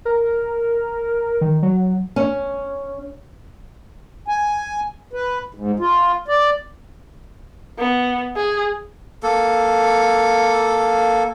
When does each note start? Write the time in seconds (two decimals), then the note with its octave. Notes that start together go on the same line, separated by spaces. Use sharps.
0.05 A#4
1.41 D#3
1.63 F#3
2.16 C#4
4.28 G#5
5.13 B4
5.55 G#2
5.80 F4
6.28 D5
7.79 B3
8.36 G#4
9.23 A#3 A4